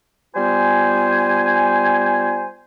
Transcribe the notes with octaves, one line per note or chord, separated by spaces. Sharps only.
G3 B3 F4 C5 G#5